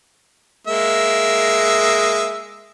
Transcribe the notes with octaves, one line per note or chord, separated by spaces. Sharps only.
G#3 A#3 E5